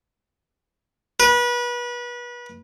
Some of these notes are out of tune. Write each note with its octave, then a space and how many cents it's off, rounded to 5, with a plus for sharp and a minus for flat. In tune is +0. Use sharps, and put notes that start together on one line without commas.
B4 -30